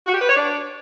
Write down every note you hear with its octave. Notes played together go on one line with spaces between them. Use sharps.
F#4
G4
B4
C#5
D4